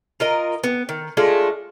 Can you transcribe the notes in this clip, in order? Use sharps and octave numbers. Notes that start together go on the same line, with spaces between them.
F4 A#4 D#5
B3
D#3
G#3 A3 D4 F4